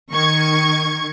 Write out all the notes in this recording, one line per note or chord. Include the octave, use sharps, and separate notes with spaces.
D#3 C#6 G#6